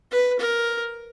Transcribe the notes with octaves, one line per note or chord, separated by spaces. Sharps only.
B4
A#4